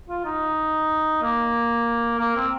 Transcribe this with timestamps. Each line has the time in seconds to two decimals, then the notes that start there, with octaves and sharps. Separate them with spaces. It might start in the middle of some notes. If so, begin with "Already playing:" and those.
0.09 F4
0.25 D#4
1.22 A#3
2.19 A#3
2.36 C4